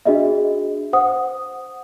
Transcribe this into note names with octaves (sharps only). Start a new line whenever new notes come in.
D4 F#4 G#4 D#5 E5
C5 F#5 D#6